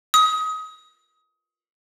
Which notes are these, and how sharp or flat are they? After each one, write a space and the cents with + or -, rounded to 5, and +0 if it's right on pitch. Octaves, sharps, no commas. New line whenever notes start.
D#6 +25